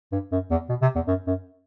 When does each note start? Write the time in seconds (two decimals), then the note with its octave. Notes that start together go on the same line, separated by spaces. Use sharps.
0.12 G2
0.32 F#2
0.51 E2
0.69 B2
0.82 C3
0.96 E2
1.07 F#2
1.27 F#2